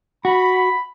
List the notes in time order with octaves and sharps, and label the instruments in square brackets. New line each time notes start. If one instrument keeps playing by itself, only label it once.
[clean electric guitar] F#4 [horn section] B5